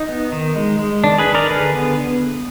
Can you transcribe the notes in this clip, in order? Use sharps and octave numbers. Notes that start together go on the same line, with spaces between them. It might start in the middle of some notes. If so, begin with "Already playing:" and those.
Already playing: D#4
B3
D#3
G#3
G#3
D#3 D4
G#4 B4
D#3
A#4 D5
D3 G#4 B4
B3